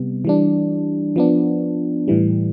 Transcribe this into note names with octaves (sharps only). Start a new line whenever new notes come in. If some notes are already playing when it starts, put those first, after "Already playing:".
Already playing: C3 G3 B3
E3 G3 D4
F3 B3 D4
A2 E3 G3